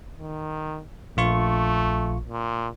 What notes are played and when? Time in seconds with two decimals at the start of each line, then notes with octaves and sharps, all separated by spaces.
0.18 D#3
1.17 A#1 A3 F4 C#6
2.28 A#2